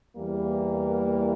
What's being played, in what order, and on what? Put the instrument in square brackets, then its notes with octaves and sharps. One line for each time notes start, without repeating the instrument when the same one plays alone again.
[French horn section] E2 E3 G3 A#3